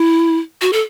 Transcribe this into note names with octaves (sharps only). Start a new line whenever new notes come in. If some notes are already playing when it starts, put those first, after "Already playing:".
Already playing: E4
F#4
A4